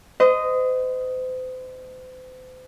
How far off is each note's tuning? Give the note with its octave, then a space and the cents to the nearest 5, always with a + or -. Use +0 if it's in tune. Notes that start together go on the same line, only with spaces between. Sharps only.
C5 -40 D#5 +0